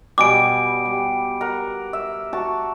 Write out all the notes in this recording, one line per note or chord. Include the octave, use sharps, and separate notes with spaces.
B2 G3 G#4 D6 D7
G3
A#4 F#5
E5
F#4 A5 C#6